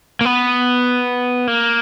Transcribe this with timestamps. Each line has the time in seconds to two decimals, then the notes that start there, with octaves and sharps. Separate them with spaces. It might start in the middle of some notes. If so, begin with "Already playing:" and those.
0.21 A#3
0.25 B3
1.47 A#3